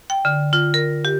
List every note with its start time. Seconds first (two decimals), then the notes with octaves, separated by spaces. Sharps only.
0.10 G5
0.25 D3
0.53 F4
0.74 A#4
1.05 G4